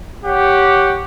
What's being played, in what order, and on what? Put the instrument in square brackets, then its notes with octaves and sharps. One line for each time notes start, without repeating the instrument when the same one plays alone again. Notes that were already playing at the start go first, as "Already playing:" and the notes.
[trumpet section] G4 C#5 F#5